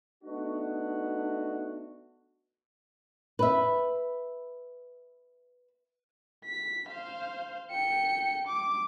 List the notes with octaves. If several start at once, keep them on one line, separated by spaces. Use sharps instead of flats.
A3 B3 D4 D#4 F#4
B4 E5
B6
C5 F5
G5 C#7
D6